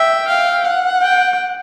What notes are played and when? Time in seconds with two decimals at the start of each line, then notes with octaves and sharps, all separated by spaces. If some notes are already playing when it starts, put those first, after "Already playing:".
Already playing: E5 G5
0.27 F5
0.65 F#5
1.02 G5